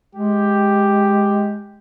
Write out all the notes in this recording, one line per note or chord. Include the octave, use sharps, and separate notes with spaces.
G#3 G4